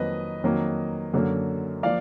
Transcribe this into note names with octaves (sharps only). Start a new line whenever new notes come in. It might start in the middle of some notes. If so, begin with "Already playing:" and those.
Already playing: F2 D#3 F#3 A#3 B4 D#5
F2 D#3 F#3 A#3
F#2 D3 F#3 A#3
F3 A#3 D5 F5